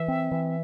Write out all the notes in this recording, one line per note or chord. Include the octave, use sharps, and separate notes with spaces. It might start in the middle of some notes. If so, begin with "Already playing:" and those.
Already playing: E3 E5
C4
E3